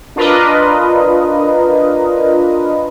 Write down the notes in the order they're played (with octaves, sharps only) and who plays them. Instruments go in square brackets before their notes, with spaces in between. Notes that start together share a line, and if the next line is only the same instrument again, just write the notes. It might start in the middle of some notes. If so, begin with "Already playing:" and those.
[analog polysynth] D4 F4 A#4 B4 D#5